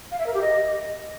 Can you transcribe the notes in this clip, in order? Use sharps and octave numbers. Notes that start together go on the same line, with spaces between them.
F5
E5
A#4
G4
D#5